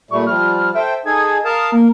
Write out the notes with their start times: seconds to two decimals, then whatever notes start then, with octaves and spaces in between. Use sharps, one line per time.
0.11 A#2 G3 A3 C#6
0.27 F3 G3 F6
0.75 A4 C5 E5 G5
1.06 D#4 G#4 A4 G#6
1.45 A#4 F5 A5 D#6
1.72 A#3 A#4